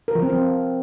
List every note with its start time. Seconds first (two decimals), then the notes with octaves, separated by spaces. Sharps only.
0.08 A#4
0.15 F3
0.23 C4
0.30 F3